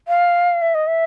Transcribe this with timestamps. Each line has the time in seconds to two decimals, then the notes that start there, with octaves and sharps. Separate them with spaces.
0.08 F5
0.62 E5
0.75 D#5
0.87 E5